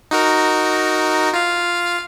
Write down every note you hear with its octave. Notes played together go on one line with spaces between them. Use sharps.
D#4 F#4 A#4
F4 F5